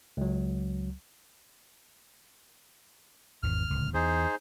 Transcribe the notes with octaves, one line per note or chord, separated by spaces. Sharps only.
C#2 F#3
G#1 E2 E3 F6
D1 C#2
E2 D#4 G#4 C5